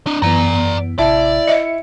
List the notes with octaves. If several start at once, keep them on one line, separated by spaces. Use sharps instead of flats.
D4 D#5
F#2 E3 B3 D5 A#5
A1 C3 E4 D5 A5
D#5 E5 C#7